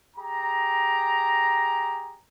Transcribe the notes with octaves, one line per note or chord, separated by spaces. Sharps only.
G4 G#4 A#5